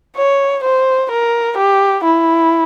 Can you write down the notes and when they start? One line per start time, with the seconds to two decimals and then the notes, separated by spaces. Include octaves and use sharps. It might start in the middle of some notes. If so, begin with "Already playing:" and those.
0.17 C#5
0.63 C5
1.11 A#4
1.58 G4
2.04 E4